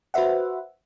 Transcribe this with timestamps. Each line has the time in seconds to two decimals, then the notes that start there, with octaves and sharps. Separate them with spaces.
0.14 F#4 B4 C5 E5 F#5